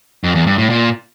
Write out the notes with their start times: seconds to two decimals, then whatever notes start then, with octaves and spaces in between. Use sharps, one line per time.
0.24 F2
0.35 E2
0.47 G2
0.58 A2
0.70 A#2